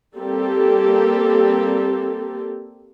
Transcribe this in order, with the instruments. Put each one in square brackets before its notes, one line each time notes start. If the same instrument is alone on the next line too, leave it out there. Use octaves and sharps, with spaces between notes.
[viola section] G3 A#3 C4 G4 A4